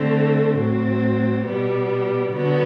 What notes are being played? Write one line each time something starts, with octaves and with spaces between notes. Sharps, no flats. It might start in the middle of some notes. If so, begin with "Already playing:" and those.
Already playing: D3 A3 C4
A2 F#3 C4
B2 G3 B3
D3 F#3 B3